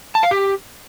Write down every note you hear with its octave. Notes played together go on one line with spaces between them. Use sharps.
A5
F5
G4